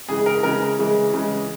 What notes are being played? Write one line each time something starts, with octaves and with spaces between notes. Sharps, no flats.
C#3 E3 G#3 G#4
A#4
C#3 E3 G#3 A#4
C#3 E3 G#3
C#3 E3 G#3